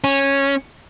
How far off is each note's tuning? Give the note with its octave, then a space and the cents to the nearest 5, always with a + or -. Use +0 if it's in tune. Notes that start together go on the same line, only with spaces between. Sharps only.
C#4 -10